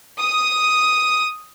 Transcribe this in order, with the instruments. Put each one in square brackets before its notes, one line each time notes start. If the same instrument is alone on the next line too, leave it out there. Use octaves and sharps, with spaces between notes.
[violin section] D#6